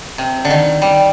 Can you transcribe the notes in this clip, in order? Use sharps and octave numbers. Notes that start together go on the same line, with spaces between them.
C3
D3
D#3
G3